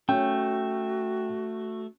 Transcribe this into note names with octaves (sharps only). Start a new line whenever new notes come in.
A3 C#4 F#4 G5